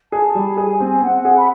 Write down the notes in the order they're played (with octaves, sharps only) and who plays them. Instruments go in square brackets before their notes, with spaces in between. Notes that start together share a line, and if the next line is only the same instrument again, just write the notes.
[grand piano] G#4 [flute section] A5
[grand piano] G3
[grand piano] G#4 [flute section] G#5
[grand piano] C4
[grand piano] C4 [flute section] F#5
[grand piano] G#4
[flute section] B5